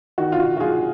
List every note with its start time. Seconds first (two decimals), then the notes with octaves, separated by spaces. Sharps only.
0.18 D#3 F#4
0.32 F4
0.40 D#3 F#4
0.57 F#4
0.60 F#3 F4 G#4